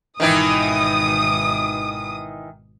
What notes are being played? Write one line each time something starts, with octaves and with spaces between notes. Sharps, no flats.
G#1 B2 D#3 E3 D#4 D#6